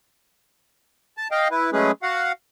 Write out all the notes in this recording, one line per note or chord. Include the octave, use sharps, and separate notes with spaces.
A5
D#5 F5 G5
E4 B4
F#3 G#3 A3 C#4 G#4 B4
F#4 F5 F#5